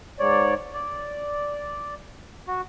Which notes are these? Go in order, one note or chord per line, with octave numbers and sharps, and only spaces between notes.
G#2 C#5 D5
D5
F#4